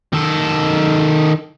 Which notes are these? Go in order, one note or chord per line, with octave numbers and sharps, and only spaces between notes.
D#3 A4